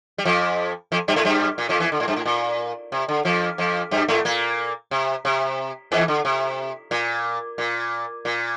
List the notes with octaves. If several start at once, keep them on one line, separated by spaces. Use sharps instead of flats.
G3
F2 F3
F2 F3
G2 G3
A2 A3
G2 G3
A#2
F2 F3
E2 E3
D3
A2
G2
A2
A#2
C3
D3
F2 F3
F2 F3
G2 G3
A2 A3
A#2 A#3
C3
C3
E2 E3
D3
C3
A#2
A#2
A#2